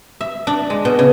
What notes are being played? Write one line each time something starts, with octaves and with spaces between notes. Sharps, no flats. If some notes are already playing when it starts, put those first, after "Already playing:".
E5
D4
G#3
B2
C#3